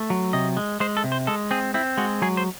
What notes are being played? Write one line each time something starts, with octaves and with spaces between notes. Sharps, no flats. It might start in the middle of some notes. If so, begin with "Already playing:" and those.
Already playing: A3
F#3
C3 D#5
G#3
G#3 C5
A4
C3
C5
G#3 A4
C4 G#4
C4 E4
G#3 F#4
F#3 G#4
C5